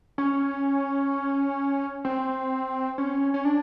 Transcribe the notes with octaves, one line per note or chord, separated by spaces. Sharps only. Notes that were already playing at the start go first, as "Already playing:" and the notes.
C#4
C4
C#4
C#4
D4